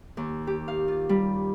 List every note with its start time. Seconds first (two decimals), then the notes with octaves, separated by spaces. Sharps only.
0.17 D#2
0.47 G4
0.68 F5
0.88 F4
1.09 G3